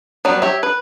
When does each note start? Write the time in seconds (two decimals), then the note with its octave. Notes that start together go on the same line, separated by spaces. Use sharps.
0.25 F#3 G3 B3
0.42 G4 C#5 E5
0.63 B4